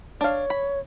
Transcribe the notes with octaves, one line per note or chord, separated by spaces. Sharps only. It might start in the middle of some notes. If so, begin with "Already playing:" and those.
D4 C#5 F5
B5